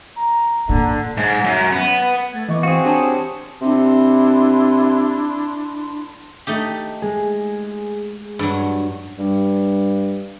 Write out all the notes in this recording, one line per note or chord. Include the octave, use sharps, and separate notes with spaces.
A#5
A#2 D3
G#2
F#2
B3
A3 G#6 A6
E3 B3 D#5 C#6 D6
C4 F#4 G#4 F5
D4 G4 C#5 G#5 A5
C3 D4 E4 C6
A3 D#4 G4
G#3 G#4
G2 F#3
G2